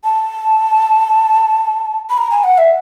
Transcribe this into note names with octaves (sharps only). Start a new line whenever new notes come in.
A5
B5
A#5
G#5
F#5
E5